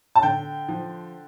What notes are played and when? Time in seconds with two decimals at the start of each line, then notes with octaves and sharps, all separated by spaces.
0.15 A5
0.23 D3 G5
0.68 F3